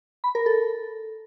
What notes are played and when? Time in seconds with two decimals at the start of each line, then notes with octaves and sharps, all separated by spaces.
0.24 B5
0.35 A#4
0.46 A4